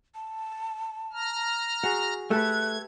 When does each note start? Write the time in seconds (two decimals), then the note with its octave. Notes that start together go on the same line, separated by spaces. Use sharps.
0.15 A5
1.13 A#5 F6
1.83 F#4 G#4
2.31 A3 G4 A4 B4 F#6 G#6